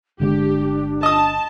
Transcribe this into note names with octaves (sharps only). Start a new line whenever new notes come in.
G1 D3 G#3 D4 G4
D#5 A5 D#6